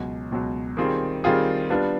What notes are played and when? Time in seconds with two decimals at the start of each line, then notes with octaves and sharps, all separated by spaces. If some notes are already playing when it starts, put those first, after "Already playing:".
Already playing: C#2 B2 F#3
0.31 C#2 B2 F#3
0.77 D#3 G3 C4 F4 G#4
1.24 D#3 G3 C4 F4 G#4
1.70 G3 B3 D4 F4